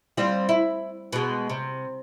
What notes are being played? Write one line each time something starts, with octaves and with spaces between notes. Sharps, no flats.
G3 C4 F4
E4
B2 G#3
C3